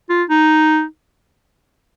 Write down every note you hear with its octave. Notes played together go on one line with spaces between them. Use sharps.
F4
D#4